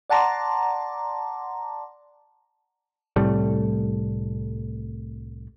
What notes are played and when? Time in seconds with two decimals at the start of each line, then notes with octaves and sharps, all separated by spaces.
0.10 D5 F#5 A5 A#5 C6 D6
3.16 C2 A2 G3 A3